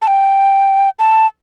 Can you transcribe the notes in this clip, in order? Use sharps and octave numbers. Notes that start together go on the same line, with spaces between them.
A5
G5
A5